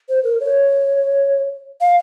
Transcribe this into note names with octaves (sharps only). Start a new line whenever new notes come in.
C5
A#4
C#5
F5